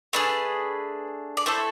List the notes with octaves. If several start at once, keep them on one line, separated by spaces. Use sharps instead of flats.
A3 D4 G#4 B4
D5
A3 E4 A4 C5